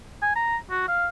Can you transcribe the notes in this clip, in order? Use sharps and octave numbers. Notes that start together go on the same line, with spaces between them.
G#5
A#5
F#4
F5